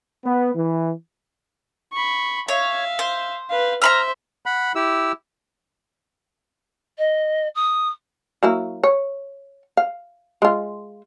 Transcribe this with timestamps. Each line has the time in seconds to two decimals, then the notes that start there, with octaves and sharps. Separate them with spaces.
0.25 B3
0.55 E3
1.93 B5 C#6
2.48 C#5 E5 F5
2.99 C5
3.50 B4 F5
3.82 C5 E5 A#5 B5 F6
4.46 F#5 B5
4.75 E4 G4 E6
6.98 D#5
7.55 D#6
8.43 F#3 A#3 E4
8.83 C#5
9.77 F5
10.42 G#3 F4